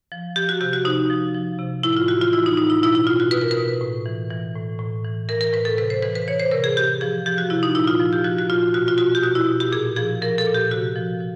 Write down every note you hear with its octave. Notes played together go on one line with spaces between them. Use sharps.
F3
F3 G4
F#4
C3 G4
F#4
C3 D#4
F3
F3
C3
A2 E4
F4
E3 F#4
F4
E3 E4
D#4
A2 D#4
E4
B2 E4
E4
B2 F4
F#4
B2 B4
A#4
B4
B2
A2
E3
E3
A2
A2
E3
E3 A#4
A#4
A2 B4
A4
C3 B4
C5
E3 B4
B4
E3 C#5
C5
C3 A#4
G#4
C3 G4
F3 G#4
F3 G4
F#4
C3 E4
D#4
A#2 E4
F4
F3
G4
F3 F#4
F#4
A#2 F4
B2 F#4
F4
B2 F#4
G4
B2 F#4
E4
B2
G4
A#2 G#4
F3 G#4
F3 A#4
A4
A#2
G4
C3 F#4
F3
F3